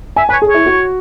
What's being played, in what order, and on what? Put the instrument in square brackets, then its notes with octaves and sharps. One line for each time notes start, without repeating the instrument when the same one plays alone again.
[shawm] E5 [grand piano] G#5
[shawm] B4 [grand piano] G#5
[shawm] C#5
[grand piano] G#4
[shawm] C#5
[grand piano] E4
F#4